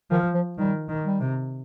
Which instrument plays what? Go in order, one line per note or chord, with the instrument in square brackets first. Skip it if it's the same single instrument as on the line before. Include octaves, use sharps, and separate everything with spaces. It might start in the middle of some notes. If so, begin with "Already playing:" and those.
[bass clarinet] D#3 [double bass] F3
[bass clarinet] F3
[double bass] D#3 [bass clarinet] G3
[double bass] D#3
[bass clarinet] G3
[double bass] C3